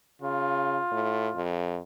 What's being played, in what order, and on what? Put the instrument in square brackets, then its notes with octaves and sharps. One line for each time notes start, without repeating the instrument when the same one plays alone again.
[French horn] C#3 [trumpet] F4
[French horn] A2
F2